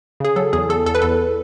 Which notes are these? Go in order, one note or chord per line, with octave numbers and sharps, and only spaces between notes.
C#3 G#4
F#3 A4
E2 G#4
E2 A4
E2 A4
B4
E2 A4